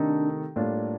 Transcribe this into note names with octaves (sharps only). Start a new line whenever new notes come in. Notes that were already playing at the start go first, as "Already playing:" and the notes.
Already playing: C3 D#3 A3 D4 D#4 A4
A2 G3 A#3 D4 F4